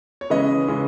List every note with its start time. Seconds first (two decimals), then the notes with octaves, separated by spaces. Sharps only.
0.21 C#5
0.30 C#3 E3 G#3 C#4 B4 D#5
0.68 C#3 E3 G#3 C#4